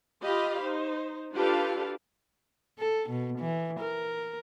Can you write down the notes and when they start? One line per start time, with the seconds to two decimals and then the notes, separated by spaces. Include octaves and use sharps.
0.23 F4 G4 D#5 F5 B5
0.61 D#4 C5
1.34 D4 F4 G4 A4 B4 F5
2.79 A4
3.10 B2
3.39 E3
3.80 A#4